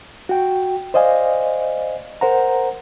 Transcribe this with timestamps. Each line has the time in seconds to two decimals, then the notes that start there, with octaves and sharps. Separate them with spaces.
0.29 F#4 G5
0.94 C5 D5 D#5 F5 G#5
2.21 A#4 C5 F#5 A#5